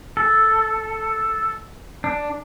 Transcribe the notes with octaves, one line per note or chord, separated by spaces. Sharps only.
A4
D4